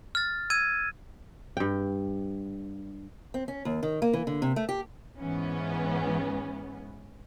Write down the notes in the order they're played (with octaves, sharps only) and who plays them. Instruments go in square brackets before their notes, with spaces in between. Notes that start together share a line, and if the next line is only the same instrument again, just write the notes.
[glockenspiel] F6 A6
E6 G#6 D#7
[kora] G2 G5
[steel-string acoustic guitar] C4
C#4
D#2
D#3
A#3
E3
D3
C3
A3
G4
[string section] G#2 E3 B3 C#4